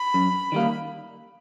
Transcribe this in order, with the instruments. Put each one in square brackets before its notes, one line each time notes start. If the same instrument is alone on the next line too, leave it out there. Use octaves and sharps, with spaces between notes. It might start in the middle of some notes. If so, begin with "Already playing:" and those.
Already playing: [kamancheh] B5
[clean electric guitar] F#2
D#3 G3 A#3